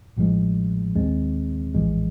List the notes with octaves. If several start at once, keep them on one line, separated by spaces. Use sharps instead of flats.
A1 A2 F3 G#3
D#2 D#3 G#3 C4
A#1 A2 E3 G#3